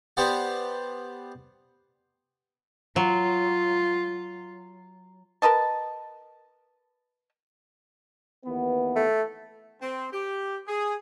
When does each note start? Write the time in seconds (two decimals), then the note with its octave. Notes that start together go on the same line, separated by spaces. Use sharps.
0.17 B3 G4 C5 D5 F#5
2.96 F#3 F4
5.42 A#4 B4 D#5 A5
8.45 D#2 E3 B3
8.96 A3
9.82 C4
10.12 G4
10.67 G#4